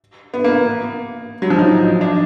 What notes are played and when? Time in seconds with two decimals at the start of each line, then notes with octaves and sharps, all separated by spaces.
0.34 B3
0.44 A#3
1.42 F#3
1.50 F3
1.59 D#4
2.01 D4